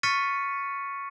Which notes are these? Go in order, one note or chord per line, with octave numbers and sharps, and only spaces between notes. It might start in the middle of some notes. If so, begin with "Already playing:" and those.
C#6 F6 A6 B6 C#7 D#7